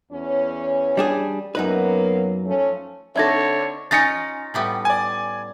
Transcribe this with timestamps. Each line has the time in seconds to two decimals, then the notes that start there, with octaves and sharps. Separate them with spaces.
0.12 E2 C#4
0.97 G3 D4 G#4
1.55 F#2 F#3 A#3 B3 D#4 B4
2.46 F3 A3 C#4
3.16 D3 C4 D#4 A4 C#5 E5 G#6 A#6
3.91 C#4 D#4 F4 A6 A#6 C#7
4.54 A2 G3 B3
4.85 D5 G#5